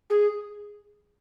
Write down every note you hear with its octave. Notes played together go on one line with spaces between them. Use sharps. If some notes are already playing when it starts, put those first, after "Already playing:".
G#4